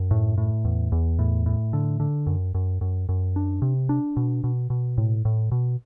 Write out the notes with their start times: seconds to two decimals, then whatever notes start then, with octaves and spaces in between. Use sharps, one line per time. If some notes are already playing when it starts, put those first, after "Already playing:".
Already playing: F#2
0.11 A2
0.38 A2
0.65 E2
0.92 E2
1.19 A2
1.46 A2
1.73 D3
2.00 D3
2.27 F#2
2.55 F#2
2.81 F#2
3.09 F#2
3.36 D4
3.62 C3
3.89 D4
4.17 B2
4.44 B2
4.70 B2
4.98 A2
5.25 A2
5.52 B2